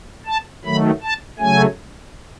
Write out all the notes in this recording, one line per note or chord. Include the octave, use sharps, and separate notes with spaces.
A5
D#3 F#3 A3 B5
A5
C#3 F#3 A3 G#5